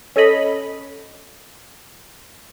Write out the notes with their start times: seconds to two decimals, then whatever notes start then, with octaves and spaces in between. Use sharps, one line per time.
0.16 C#4 A4 C#5 D#5 B5